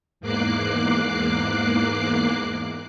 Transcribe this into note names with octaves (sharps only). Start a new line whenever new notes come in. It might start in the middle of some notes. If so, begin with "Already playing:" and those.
E2 G#2 A#3 D6 F#6 C7